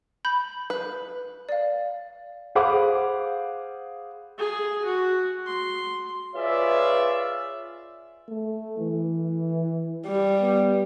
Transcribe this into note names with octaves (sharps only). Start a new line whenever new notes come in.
B5 G6
B4
D5 F5
G#4 C5 F5 F#5 B5 D6
G#4
F#4
C6
F4 G#4 B4 C#5 D5 E5
A3
E3
G3
B3